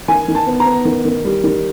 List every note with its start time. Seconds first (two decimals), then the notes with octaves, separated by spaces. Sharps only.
0.08 D#3 G#5
0.28 D#3
0.35 A5
0.47 B3
0.60 A#5
0.66 B3
0.85 D#3
1.05 D#3
1.25 G3
1.44 D#3